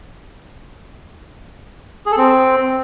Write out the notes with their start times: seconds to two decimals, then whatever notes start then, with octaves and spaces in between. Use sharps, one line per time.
2.06 G#4
2.12 A4
2.18 C4